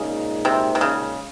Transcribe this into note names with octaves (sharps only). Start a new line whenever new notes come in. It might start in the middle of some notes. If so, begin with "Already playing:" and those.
Already playing: A#2 C#3 G#3 D#4 G#4
C3
C3
C#3